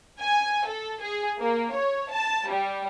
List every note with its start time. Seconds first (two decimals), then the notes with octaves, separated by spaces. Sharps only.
0.20 G#5
0.67 A4
1.01 G#4
1.40 A#3
1.74 C#5
2.11 A5
2.48 G3